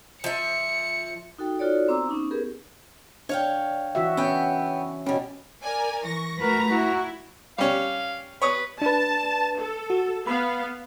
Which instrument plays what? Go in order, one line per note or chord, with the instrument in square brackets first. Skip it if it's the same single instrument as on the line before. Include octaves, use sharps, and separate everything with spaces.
[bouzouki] F3 E5 [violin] C#7
[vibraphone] D#4 F#4 A4 G5
D#4 F4 F#4 A4 C#5 D5
B3 C4 C5 A#5 D6 E6
B3 C#4 D#4
B3 G4 G#4 A#4 B4
[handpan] D4 [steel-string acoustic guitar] C#5 F5 G5
[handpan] E3 F#4 E5
[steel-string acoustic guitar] B3 G5 [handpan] C#4
[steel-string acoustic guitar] B2 G3 [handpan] C#4
[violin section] A#4 D5 G#5
[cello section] E3 [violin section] C#6 A#6
[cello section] A3 F#4 B4 [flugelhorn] A#4 [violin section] A#5
[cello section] E4 [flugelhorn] F#4
[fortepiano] G3 C#4 [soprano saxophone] F5
[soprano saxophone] B4 [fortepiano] C#5 D#6
[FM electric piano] D4 B4 [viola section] A5
[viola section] A4
[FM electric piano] F#4
[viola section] B3 F5 [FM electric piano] B5